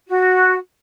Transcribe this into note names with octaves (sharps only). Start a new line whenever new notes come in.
F#4